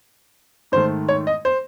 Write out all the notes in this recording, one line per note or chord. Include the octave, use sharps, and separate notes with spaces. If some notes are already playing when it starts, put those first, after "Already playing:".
G#2 D#3 A3 C5
C#5
D#5
C5